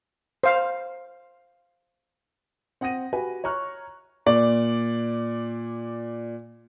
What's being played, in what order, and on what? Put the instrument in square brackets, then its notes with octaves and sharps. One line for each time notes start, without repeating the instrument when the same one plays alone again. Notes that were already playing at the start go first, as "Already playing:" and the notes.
[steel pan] C5 F5
[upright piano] C4 F#5 D#6 A#6 D#7
F#4 G4 B4 G#5
C#5 A#5 C#6 F6 F#6
A#2 D5